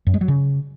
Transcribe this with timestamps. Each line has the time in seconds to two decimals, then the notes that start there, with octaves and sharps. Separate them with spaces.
0.07 F#2
0.14 G#3
0.21 F#3
0.28 C#3